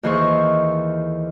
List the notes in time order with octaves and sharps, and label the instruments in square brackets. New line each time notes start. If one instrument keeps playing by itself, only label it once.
[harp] D#2 D#3 E3 G#4 C5 C#6